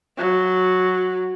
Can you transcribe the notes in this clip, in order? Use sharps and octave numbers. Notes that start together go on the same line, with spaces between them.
F#3